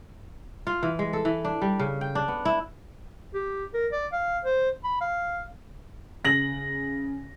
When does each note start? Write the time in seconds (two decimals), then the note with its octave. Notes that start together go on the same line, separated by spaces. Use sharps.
0.67 F4
0.83 E3
0.99 G#3
1.13 A4
1.25 E3
1.45 D4
1.62 G3
1.79 C#3
2.01 G5
2.15 D4
2.28 B3
2.45 E4
3.34 G4
3.74 A#4
3.92 D5
4.12 F5
4.45 C5
4.84 B5
5.01 F5
6.24 C#3 A#6 F#7